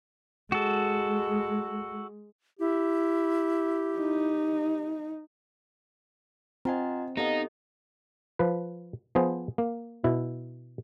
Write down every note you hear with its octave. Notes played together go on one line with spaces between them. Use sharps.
G#3 F#4 A4
E4 G4
D#4
C4 F4 D#5 F#5 G#5 A#5
B3 D#4 G4 A4 D#5 F5 F#5
F3 B4
F3 B3 G#4 C5
A#3
B2 E4